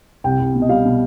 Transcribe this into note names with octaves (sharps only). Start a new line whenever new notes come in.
C2 G5
C2
B2
D#5
G3 F5
B2